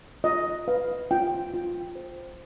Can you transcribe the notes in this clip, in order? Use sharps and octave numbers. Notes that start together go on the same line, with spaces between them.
F4 D#5
B4 F5
F4 G5
F4
C5